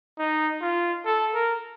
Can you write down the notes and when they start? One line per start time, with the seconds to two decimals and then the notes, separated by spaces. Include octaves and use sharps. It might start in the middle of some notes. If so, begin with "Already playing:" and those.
0.19 D#4
0.62 F4
1.06 A4
1.34 A#4